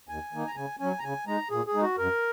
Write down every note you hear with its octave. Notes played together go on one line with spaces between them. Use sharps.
D#2 G#5
D#3 A#3 D#4
A#5
C#3 G#5
F#3 C#4 G#5
A#5
C#3 G#5
G#3 D#4 A#5
A#2 G#4
G#4
G#3 D#4
F#4
F#2 A#4